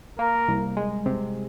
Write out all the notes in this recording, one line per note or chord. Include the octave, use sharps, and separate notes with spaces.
A#3 A#4
C2
G#3
C3